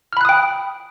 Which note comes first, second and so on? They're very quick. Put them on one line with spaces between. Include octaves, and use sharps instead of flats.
F6 B5 F#6 D#6 G5